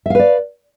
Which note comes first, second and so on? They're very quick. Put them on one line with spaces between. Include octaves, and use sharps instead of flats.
E5 F5 B4 D5